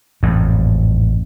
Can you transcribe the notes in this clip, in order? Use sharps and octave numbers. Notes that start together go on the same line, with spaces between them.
A1 F2 G#2